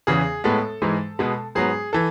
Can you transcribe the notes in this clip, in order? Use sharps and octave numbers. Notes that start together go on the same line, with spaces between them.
E2 C#3 E3 B3 G#4
A2 G#3 B3 A4
G#2 E3 G#3
B2 G#3 B3
G#2 F#3 B3 G#4
E3 A4